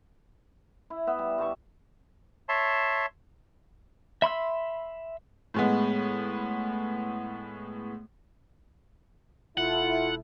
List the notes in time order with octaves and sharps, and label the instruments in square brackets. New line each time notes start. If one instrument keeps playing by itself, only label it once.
[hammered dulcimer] E4
B3 E5
G3
G2 G4 A5 C#6
[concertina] C#5 E5 A5 C6
[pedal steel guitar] E5 B5 C6 E6
[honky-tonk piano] A2 G#3 B3
[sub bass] E1 [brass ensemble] E4 A4 [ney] F4 [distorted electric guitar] F#5